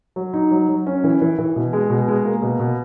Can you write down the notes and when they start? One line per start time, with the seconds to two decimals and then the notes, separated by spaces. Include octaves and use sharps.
0.16 F#3
0.34 D#4
0.51 F#3
0.69 F#3
0.87 C#4
1.04 E3
1.22 E3
1.38 E3
1.56 B2
1.73 G#3
1.90 B2
2.08 G#3
2.25 A#3
2.42 B2
2.60 B2